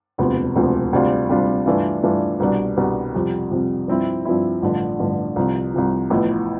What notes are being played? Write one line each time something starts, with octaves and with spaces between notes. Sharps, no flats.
E1 D2 C3 F3 B3
E1 D2 C3 F3 B3
D2 C3 G3 D4 F4
D2 C3 G3 D4 F4
G2 E3 A3 D4 F4
G2 E3 A3 D4 F4
C2 B2 G3 D4
C2 B2 G3 D4
F2 C3 G3
F2 C3 G3
G2 F3 C4 E4
G2 F3 C4 E4
A1 G2 D3 F3
A1 G2 D3 F3
C2 C3 F3
C2 C3 F3
A1 A2 F3 B3